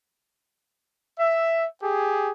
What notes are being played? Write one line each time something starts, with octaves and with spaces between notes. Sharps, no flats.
E5
G4 G#4